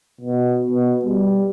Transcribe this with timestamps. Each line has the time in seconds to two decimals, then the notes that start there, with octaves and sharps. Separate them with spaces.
0.21 B2
0.71 B2
1.05 G3